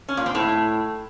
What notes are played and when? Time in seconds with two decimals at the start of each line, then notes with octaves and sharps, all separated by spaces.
0.09 C#4
0.17 A#2
0.26 C4
0.35 A2